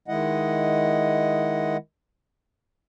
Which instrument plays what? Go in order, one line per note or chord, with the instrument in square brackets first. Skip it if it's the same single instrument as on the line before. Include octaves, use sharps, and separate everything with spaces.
[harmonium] D#3 G#3 E4 D#5 F#5